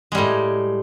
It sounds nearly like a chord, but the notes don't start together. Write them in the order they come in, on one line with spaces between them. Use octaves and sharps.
G#3 G3 A2